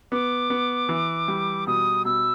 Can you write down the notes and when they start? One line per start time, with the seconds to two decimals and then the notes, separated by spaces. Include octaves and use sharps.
0.12 B3 D6
0.50 B3
0.89 E3
1.28 G3
1.67 B2 D#6
2.05 B2 E6